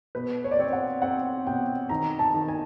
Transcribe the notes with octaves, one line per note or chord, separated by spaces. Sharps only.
B2 B4
C#5
D5
C4 C#5
F#5
C4 F#5
B2 G5
D#3 A#5
A5
D#3
G#5